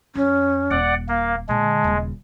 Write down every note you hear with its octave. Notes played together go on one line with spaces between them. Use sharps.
F2 C#4
D#1 D5 F#5
A#3 F5
A#2 D3 G#3 A5
D#1 C#3